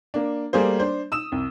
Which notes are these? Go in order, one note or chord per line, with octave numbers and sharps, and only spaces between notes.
A#3 D4
G3 A3 A#3 G#4 C5
D4 C5
D#6 E6 E7
C2